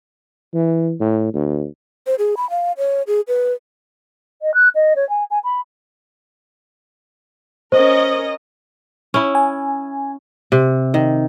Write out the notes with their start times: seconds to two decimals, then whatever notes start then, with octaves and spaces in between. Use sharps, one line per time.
0.54 E3
1.00 A2
1.34 D2
2.07 C5
2.19 G#4
2.37 B5
2.50 F5
2.78 C#5
3.07 G#4
3.28 B4
4.42 D#5
4.54 F#6
4.75 D#5
4.96 C#5
5.09 G#5
5.30 G#5
5.44 B5
7.72 C#4 A#4 C5 D#5
9.14 C#4 E4
9.35 G#5
10.52 C3
10.94 D#3